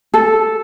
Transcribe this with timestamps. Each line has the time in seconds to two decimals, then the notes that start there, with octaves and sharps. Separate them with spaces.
0.14 A4